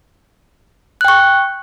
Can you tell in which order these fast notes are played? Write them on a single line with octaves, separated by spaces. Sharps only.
F#6 G5 C#6